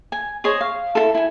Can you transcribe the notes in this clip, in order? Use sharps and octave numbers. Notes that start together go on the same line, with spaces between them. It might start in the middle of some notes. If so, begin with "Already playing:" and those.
G#5
G#4 C5 C#5 D#5
F5
E4 F4 A4
E4 G#5